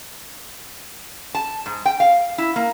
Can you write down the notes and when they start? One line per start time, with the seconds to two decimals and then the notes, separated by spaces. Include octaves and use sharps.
1.35 A5
1.66 G#2
1.86 G5
2.00 F5
2.38 E4
2.56 A#3